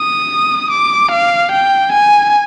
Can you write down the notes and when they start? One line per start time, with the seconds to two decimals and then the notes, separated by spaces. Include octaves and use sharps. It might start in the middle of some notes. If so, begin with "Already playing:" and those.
Already playing: D#6
0.71 D6
1.11 F5
1.52 G5
1.92 G#5